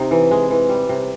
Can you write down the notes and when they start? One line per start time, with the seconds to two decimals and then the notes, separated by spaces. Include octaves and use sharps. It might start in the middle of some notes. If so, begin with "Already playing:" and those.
Already playing: C3 D#4
0.11 E3
0.31 G#3
0.51 E3
0.69 G3
0.89 C3